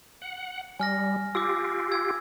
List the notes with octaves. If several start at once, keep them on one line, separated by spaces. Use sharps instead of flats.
F#5
G3 G#5 F6 A#6
F4 G4 D6 E6
E6 G#6